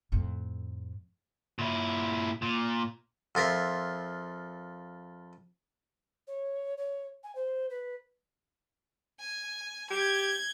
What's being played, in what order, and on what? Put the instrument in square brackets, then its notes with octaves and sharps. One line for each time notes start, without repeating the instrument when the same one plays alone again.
[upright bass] F2 A2
[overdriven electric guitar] A#2 E4
A#2
[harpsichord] F2 F4 A#4 E5
[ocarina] C#5
C#5
G#5
C5
B4
[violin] G#5
[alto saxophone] G4 [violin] G6 G#6